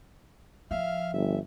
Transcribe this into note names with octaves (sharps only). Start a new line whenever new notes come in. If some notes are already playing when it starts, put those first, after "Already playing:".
F3 E5 F5 F6
G1 E5